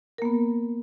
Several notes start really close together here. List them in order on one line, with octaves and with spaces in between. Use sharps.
A#4 A#3 B3